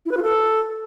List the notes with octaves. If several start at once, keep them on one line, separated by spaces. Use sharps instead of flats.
E4
B4
F4
A4